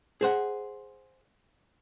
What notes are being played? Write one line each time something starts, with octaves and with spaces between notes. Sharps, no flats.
G#4 C5 F#5